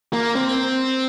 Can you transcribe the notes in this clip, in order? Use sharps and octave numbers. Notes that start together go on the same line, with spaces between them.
A#3
C4